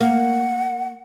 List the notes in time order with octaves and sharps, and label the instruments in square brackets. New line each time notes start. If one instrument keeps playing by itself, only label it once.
[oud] A#3 [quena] F#5